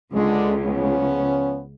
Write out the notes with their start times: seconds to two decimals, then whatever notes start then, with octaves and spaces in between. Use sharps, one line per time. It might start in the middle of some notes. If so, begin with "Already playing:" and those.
0.14 C#2 D3 G#3
0.64 F3 B3 C#4